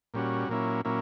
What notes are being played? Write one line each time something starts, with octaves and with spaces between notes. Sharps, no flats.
A#2 G3 C#4 F#4
A#2 F#3 A#3 C#4 E4
A#2 F#3 A#3 C#4 E4